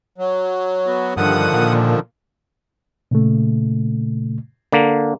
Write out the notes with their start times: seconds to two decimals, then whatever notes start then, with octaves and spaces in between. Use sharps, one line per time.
0.18 F#3
0.87 B3 F#4
1.17 G2 D3 D#3 F3 F#5 D#6
1.53 A#2
3.11 A#2 C#3 A3
4.72 D3 A#3